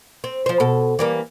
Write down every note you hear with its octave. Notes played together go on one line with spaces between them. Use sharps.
C4
F3 C5
B2 A4
E3 G3 A#3